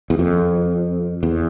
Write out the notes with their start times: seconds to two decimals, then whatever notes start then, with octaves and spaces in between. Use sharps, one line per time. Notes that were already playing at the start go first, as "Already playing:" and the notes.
0.10 E2
0.19 F2
1.23 E2